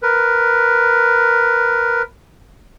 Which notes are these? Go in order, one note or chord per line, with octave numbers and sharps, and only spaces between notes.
A#4 B4